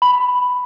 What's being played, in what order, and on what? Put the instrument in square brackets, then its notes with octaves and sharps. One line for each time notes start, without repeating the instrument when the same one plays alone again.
[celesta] B5